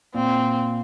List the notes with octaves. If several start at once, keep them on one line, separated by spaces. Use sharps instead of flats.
A#2 C4